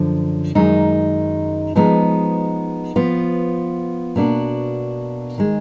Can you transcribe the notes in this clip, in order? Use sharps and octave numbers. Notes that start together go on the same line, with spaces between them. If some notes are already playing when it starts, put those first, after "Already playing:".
Already playing: F#2 D3 F3
F#2 D#3 G#3 D#4
F3 G#3 B3 D#4
F3 B3 F4
B2 A#3 D4 F#4
D#3 G#3